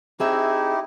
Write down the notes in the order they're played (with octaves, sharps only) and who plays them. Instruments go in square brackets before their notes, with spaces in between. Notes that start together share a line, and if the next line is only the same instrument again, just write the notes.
[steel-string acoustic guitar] C4 G#4 E5 [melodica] D#4 E4 G4